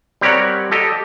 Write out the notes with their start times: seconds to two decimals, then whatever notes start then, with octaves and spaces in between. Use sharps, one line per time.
0.21 G3 C4 G4 A#4 C#5 F#5
0.71 G4 A4 D#5